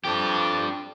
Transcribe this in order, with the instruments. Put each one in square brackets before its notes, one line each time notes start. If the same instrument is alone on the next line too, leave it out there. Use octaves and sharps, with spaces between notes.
[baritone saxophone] F2 [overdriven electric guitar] D4 G4